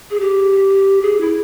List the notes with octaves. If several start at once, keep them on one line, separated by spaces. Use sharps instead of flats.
G#4
G4
G#4
E4